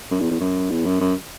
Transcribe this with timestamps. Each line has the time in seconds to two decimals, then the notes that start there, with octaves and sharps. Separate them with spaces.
0.11 F#2
0.21 E2
0.31 E2
0.41 F#2
0.71 E2
0.85 F#2
1.01 F#2